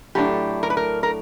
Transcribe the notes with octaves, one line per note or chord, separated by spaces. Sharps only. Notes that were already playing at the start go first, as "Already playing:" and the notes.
A2 F#3 A3 D4 G4
A#4
B4
A#4
A#4